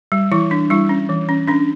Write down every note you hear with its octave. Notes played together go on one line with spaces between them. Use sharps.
G3
E3 E4
D4
G3 E4
C#4
E3
C#4
C#4 D4